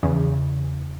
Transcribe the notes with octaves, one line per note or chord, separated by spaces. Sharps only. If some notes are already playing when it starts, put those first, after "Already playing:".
E2 C#3